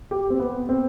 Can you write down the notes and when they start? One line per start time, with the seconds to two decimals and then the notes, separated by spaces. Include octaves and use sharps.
0.11 G4
0.30 C4
0.40 B3
0.69 C4